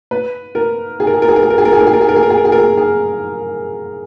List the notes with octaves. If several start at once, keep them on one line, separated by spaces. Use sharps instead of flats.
B4
A#4
G#4
A#4
G#4
A#4
G#4
A#4
G#4
A#4
G#4
A#4
G#4
A#4
G#4
A#4
G#4
A#4
G#4
A#4
G#4
A#4
G#4
A#4
G#4
G#4